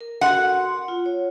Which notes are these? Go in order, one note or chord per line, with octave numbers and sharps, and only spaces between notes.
A#4
F#4 A#4 F#5 C6
F4
C#5